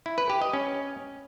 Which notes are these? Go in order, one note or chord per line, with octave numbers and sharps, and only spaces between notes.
E4
B4
G4
D#5
C#4